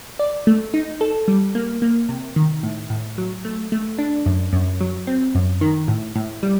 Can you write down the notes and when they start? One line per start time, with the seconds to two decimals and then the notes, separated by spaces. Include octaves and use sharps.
0.19 D5
0.47 A3
0.74 D#4
1.01 A4
1.28 G3
1.55 A#3
1.82 A#3
2.09 C3
2.36 D#3
2.63 A2
2.90 A2
3.18 F#3
3.45 A3
3.72 A3
3.98 D4
4.26 F#2
4.53 F#2
4.81 F#3
5.07 C4
5.35 F#2
5.61 D#3
5.88 A2
6.15 A2
6.43 G3